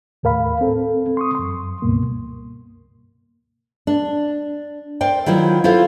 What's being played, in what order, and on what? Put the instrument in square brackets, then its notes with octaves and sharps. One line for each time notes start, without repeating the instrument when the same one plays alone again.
[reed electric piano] D#2 A2 A#4 F5 B5
C4 A4
C6 C#6 D#6
F#2 C6
C#2 G2 B2 A#3
[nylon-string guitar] D4
A#4 C5 D5 G5
D#3 F#3 E4 F4 C5
E4 F4 A4 C5 F5